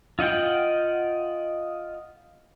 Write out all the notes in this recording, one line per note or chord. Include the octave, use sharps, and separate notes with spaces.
F4 D#5 F#5 G5